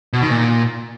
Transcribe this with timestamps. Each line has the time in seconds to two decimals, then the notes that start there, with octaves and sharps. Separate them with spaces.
0.13 B2
0.22 D#3
0.30 A#2